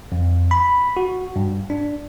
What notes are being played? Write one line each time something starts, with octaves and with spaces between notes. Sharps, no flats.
F2
B5
F#4
G2
D4